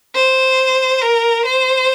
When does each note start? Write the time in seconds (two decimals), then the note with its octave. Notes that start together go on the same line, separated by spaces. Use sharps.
0.15 C5
1.02 A#4
1.46 C5